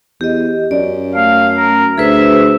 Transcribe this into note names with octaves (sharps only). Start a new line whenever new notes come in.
E2 G4 D#5
F#2 D5
A3 F5
A#4
D2 G#4 B4 C5 E5